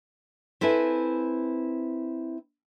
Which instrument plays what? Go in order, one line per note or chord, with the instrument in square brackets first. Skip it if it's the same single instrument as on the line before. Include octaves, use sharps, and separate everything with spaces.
[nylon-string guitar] C4 E4 A4 B4 E5 G#5